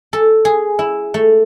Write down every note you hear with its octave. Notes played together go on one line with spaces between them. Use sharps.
A4
G#4
E4
A3